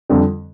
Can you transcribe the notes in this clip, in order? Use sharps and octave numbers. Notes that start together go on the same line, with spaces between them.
F2 D3 G3